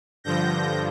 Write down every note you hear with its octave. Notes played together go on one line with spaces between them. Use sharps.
G2 D3 F3 G6 A#6